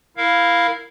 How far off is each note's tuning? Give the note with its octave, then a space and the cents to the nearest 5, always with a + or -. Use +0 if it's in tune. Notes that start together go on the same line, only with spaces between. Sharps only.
E4 +0 A#4 +0 F5 +0